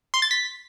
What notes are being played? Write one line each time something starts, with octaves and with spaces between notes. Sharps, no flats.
C6
A6
B6